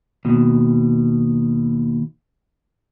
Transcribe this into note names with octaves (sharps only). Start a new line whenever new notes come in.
D#2 B2